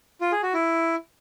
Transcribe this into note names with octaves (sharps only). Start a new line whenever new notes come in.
F4
G#4
F#4
E4